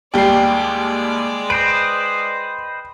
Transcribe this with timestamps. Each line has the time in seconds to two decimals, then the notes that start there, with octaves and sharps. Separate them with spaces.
0.14 D#2 G3 G#3 D5 G5 C7
1.50 B4 C5 D#5 D7